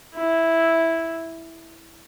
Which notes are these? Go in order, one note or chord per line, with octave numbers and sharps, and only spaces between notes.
E4